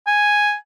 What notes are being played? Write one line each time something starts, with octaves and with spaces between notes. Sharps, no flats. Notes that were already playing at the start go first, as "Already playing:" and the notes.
G#5